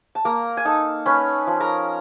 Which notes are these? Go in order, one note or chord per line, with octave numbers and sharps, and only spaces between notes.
A5
A#3 A#4 A#5
G#5
D#4 A4 A5
C#4 B4 B5
F3
A#4 A#5